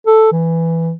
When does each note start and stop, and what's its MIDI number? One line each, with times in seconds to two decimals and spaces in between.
0.07 0.32 69
0.32 0.93 52